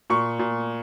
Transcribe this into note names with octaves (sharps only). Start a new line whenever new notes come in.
A#2 C#6
A#2